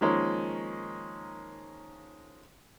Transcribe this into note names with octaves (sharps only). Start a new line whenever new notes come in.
D#3 F3 G#3 A#3 C#4